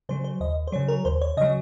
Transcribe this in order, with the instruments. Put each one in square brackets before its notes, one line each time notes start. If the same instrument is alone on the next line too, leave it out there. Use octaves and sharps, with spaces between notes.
[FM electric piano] C#3 F#3 C5
C5
D#2 D#5
C5
C#3 F#3 C#5
A#4
D#2 C5
C#5
C#3 F#3 D#5